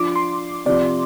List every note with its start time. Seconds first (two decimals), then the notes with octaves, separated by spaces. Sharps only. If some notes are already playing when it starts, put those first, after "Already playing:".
Already playing: F3 D4 F4 D6
0.16 C6
0.65 C3 F3 C4 D5